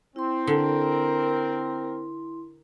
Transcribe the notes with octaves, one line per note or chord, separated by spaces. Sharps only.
C4 E4 C6
D3 A#4